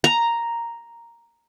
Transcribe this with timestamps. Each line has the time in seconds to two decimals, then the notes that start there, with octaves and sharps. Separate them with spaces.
0.04 A#5